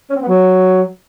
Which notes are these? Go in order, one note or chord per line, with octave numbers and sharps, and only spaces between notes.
C#4
C4
B3
F#3